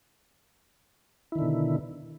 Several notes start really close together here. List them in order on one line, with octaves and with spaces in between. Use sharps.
E4 D#3 D3 B2